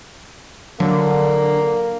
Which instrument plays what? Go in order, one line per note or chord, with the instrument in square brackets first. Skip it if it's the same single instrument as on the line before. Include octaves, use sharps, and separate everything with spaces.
[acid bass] D3 [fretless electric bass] F#3 [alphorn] A#3